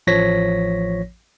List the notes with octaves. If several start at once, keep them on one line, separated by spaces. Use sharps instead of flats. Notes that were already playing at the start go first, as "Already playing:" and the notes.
A1 F3 C#5 A#6 B6